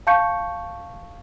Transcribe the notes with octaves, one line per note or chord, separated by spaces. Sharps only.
F5 A5 C#6 G6 C#7